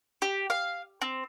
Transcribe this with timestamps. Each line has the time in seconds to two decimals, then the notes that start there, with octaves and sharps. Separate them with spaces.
0.22 G4
0.50 F5
1.02 C4